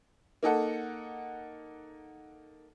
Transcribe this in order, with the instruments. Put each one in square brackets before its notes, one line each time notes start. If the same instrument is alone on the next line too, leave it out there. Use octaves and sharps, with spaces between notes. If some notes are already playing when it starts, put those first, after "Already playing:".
[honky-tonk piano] A#3 D#4 A4 F#5